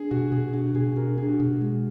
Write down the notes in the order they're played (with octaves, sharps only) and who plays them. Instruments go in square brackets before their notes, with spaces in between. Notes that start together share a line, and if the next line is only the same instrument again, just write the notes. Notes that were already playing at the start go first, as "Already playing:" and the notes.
Already playing: [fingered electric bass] D4 [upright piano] G#4
[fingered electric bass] B2 [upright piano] F#4
[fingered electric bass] B2 [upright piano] G#4
[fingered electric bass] D4 [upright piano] F#4
[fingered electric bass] B2 [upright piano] G#4
[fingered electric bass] D4 [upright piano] F#4 A#4
[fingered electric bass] D4 [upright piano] G#4
[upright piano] F#4
[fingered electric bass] B2 [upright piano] G#4
[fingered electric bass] G#3